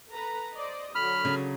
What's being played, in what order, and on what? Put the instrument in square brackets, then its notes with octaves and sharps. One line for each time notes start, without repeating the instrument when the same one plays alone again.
[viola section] A4 B4 A#5
C5 D5 D#5
[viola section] D3 F#3 [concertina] B5 F6
[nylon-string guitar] C#3